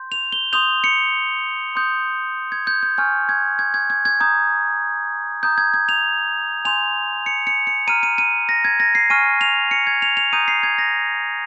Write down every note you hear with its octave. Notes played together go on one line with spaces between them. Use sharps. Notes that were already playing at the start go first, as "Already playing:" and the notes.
Already playing: C6 G6
F7
G7
C6 D#6 G6 F7
C#7
C6 D#6 G6
G#6
G6
G6
G#5 C#6 F6 G6
G#6
G#6
G#6
G#6
G#6
A#5 D#6 G6 G#6
A#5 D#6 G6
G#6
G#6
F7
G#5 C6 G6 F7
C#7
C#7
C#7
A#5 F6 D#7
D#7
D#7
A#6
G#6
A#6
C7
G#5 C#6 F6 D#7
F7
C#7
G#6
F7
F7
A#5 D#6 G6 D#7
C7
G#6
A#6